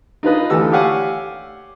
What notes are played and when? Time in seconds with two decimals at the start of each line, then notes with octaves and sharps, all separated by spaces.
0.23 D#4 F4 B4 D#5
0.50 D2 E3 G4 A4 E6
0.72 G4 C#5 D5 F5 F#5 G#5